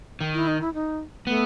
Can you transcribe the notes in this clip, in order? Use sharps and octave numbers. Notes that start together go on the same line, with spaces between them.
D#3
E4
D#4
E4
D#4
A3 B3